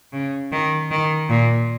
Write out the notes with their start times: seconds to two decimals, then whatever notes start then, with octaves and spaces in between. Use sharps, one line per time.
0.13 C#3
0.52 D#3
0.91 D#3
1.30 A#2